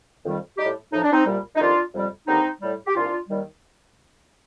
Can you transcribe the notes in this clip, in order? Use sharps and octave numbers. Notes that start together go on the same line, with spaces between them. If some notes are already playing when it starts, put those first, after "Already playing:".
F2 D#3 G3
A2 G3 D#4 G4
A2 F3 D#4
D4
C4 D#4
C2 A#2 G3
D#4
F2 D#3 G3 D4 F4
F2 C3 G3
D#2 D3 G3 C4 D#4
A2 G3
G4
C2 A#2 F3 D4 F4
D#2 D#3 G3